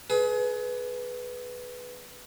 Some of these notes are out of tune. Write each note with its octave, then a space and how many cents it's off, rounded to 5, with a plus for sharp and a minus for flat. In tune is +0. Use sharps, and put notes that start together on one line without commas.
G#4 +30 B4 +0